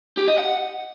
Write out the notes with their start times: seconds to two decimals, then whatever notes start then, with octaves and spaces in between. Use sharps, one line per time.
0.18 G4
0.28 D#5
0.38 F#5